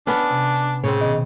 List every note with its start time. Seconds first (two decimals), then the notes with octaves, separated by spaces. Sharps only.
0.07 B3 C#4 D4
0.30 C3
0.84 A2 C#3 C4 C#5
1.01 B2 D#3 B3 D#5